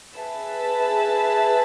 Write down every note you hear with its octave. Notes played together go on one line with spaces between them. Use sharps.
G#4 B4 E5 A5